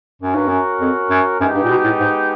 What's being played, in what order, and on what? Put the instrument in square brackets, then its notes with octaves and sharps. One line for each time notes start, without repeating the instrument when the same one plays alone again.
[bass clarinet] F#2 [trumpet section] C#4 F#4 A#4
[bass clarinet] G2
F#2
F2
F#2
[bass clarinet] F#2 [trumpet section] G#3 B3 D#4 G4
[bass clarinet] G2
A#2
B2
A2
G#2